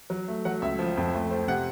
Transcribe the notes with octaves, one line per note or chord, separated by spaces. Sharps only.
F#3
A3
F#3 F#5
C#2 E5
F3
F2
A3
C4
C3 F#5